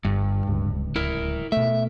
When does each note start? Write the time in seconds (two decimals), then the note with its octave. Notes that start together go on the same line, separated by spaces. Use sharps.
0.05 G1 G2
0.47 D1 C#2
0.96 E4 A#4
1.52 B2 A3 E5